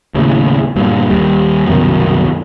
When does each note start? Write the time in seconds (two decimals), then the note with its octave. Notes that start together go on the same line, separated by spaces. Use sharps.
0.15 D#2 A2 C#3
0.76 G2 A#2 D3
1.10 D#2 G3
1.66 C2 F#2 B2 D#3